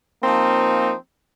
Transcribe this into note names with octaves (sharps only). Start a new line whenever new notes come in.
F3 A#3 C4 D#4